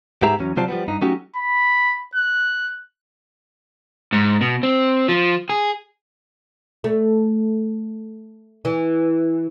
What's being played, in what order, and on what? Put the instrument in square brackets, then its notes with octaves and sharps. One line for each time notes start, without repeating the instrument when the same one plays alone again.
[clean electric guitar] G#2 B3 G4 G#4 E5 A#5
E2 F#3 C#4
C3 F#3 F4 C5 D5 A5
F3 G3 B3
G2 D#4
F#3 A3 C#4 D#4 F#4 G4
[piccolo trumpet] B5
F#6
[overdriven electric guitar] G#2
B2
C4
F3
G#4
[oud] A3
E3